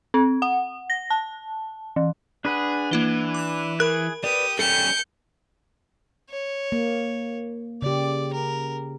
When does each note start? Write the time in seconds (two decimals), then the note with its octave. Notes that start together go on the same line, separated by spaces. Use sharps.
0.14 C4
0.42 F#5
0.90 A#6
1.10 A5
1.96 E3
2.45 D4 G#4 B4 F#5
2.91 E3 A#3 E4 G7
3.34 D6 F#6
3.80 G#4 A#4 B5 F#6
4.24 G4 B4 D5 D#6
4.59 G3 C#4 A4 G5 G6 C#7
6.30 C#5
6.72 A#3
7.82 C#3 G4 D5
8.33 A#4